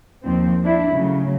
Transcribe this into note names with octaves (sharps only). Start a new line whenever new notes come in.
D#2 F3 C4
D4 E4
C#3 F#3 A3